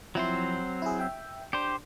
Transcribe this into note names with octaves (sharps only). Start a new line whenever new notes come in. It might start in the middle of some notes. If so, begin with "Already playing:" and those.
F3 F#3 C4 E4 C5
E4 G#4
E5 G5
D4 G4 C5